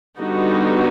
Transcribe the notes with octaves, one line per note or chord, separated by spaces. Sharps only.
D3 G3 B3 D#4 F#4